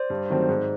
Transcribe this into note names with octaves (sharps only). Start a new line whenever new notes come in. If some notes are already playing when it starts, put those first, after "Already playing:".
Already playing: C5 D5
G2
D#3 F#3 A3 C4
G#2